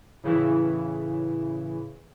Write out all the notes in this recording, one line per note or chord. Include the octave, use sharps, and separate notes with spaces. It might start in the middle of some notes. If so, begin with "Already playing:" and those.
A2 C#3 E3 E4